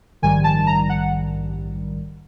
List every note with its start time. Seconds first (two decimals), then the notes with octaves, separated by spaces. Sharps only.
0.22 A#1 G#2 D#3 G3 G#5
0.44 A5
0.67 A#5
0.89 F#5